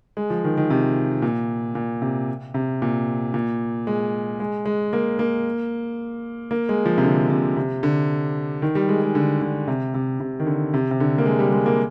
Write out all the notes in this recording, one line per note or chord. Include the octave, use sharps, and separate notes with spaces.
G#3
F3
D#3
D#3
C3
A#2
A#2
C3
C3
A#2
A#2
G#3
G#3
G#3
A#3
A#3
A#3
G#3
F3
C3
D3
C3
C3
D3
D#3
G3
G#3
G#3
D3
D3
C3
C3
C3
D#3
D3
C3
C3
D3
A#3
G#3
G3
G#3
A#3